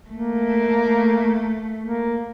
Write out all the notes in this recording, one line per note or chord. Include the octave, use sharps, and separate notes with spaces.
A3 A#3
A#3